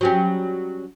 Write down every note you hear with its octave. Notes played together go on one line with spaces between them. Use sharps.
F#3 G3 C#4